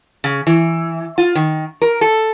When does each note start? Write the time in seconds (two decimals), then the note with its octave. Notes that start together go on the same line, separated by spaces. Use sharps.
0.24 C#3
0.47 E3
1.18 F4
1.35 D#3
1.82 A#4
2.01 A4